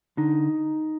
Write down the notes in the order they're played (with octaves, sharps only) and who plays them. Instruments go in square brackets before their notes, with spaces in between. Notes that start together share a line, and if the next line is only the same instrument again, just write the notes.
[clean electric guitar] D3 D#4